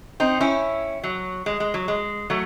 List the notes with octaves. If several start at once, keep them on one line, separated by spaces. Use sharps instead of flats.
C4 D#4
C#4 E4
F#3
G#3
G#3
F#3
G#3
F#3 A3